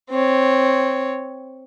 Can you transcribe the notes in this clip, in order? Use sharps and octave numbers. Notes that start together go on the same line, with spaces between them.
C4 C#5